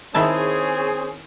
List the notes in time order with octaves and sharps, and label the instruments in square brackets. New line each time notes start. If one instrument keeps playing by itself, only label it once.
[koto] D#3 E4 A5 [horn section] C4 C#4 G#4